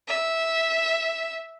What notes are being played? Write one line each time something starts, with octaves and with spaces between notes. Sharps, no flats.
E5